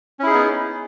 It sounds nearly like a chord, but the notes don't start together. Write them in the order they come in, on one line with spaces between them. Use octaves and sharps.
C#4 E4 G#4 D#4 B3